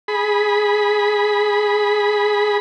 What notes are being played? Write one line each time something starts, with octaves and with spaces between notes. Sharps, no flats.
G#4 B5